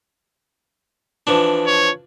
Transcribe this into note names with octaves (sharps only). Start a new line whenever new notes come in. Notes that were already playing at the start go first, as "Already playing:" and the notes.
E3 F3 D4
C#5